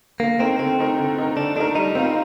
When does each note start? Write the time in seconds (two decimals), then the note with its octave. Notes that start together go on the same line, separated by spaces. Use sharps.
0.20 D3 A#3
0.39 A3 C4 D#4 A#4
0.59 D3 C4
0.78 A3 D#4 A#4
0.98 D3
1.18 A3 D#4 A#4
1.37 D3 D4
1.56 A3 D4 D#4 A#4
1.75 G3 D#4
1.95 C4 F4 A#4